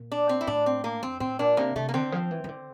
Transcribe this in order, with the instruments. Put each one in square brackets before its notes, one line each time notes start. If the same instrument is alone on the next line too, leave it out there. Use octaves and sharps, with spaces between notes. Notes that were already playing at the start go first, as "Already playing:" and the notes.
Already playing: [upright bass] A#2
[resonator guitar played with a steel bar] D4
C4
E4
[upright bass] A2 [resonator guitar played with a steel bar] D4
[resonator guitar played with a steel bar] C4
A#3
[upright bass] F2 [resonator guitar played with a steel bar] C4
[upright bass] A2 [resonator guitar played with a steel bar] C4
[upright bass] A#2 [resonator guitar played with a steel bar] D4
[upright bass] C3 [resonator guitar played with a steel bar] A#3
[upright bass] C3 [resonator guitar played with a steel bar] A3
[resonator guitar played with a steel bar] A#3
[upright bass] D3 [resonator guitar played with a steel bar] C4
[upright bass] F3
E3
E3
D3